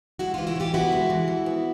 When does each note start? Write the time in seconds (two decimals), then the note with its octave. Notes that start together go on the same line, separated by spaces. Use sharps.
0.19 G#3 E4 F#4
0.34 E3 D#4 F4
0.47 E4 F#4
0.56 E3 F4 G4
0.74 B3 E4 F#4
0.92 G#3
1.10 E3
1.28 E3
1.46 B3